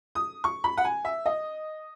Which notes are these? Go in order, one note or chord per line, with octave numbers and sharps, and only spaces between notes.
D#6
C#6
B5
F#5
G#5
E5
D#5